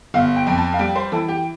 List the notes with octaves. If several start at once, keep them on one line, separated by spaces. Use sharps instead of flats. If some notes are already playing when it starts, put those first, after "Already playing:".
G1 F5
G5
F2
A5
F5
G3 G5
C5
E3 A4
G4